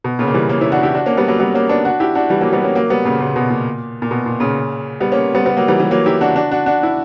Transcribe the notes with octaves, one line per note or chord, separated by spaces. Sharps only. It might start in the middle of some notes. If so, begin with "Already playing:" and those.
B2
A#2 C#3
A#3
E3 G3
A#3 C#4
C#4 E4
D4 F#4
E4 G4
D4 F#4
A#3 C#4
G3 B3
F#3 A#3
G3 B3
A#3 C#4
B3 D4
D4 F#4
E4 G4
D4 F#4
E3 G3
F#3 A#3
G3 B3
A#3 C#4
F#3 A#3
G3 B3
A#2 C#3
A#2 C#3
B2
A#2
A#2
B2
A#2
A#2 C#3
G3 B3
A#3 C#4
G3 B3
G3 B3
F#3 A#3
E3 G3
E3 G3
F#3 A#3
E4 G4
D4 F#4
D4 F#4
D4 F#4
D4 F#4
E4